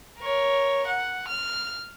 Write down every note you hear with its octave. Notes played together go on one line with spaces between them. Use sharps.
A#4 C#5
F#5
F6